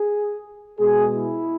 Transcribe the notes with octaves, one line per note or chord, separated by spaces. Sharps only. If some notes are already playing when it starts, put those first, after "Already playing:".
Already playing: G#4
B2 G#3 G#4
E4